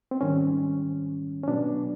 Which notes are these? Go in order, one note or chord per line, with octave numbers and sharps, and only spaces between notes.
C4
G#2 D#3 G3 C#4
C#4
B2 F#3 B3 D4